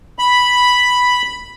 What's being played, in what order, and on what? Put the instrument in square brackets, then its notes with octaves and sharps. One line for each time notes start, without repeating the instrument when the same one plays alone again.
[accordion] B5